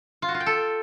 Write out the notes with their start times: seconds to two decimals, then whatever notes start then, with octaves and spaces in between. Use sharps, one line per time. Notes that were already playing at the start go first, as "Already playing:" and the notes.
0.22 F4
0.28 F#4
0.34 F4
0.40 G5
0.46 A4